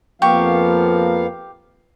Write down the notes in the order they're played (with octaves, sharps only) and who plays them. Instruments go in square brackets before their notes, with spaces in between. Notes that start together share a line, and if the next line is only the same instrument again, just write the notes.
[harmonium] F2 B3 F5 [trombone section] F3 A#3 [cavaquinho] G4 G5 C#6